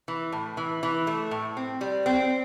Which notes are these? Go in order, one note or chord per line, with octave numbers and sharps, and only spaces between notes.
E3
A2
E3
E3
A3
A2
C4
G3
C4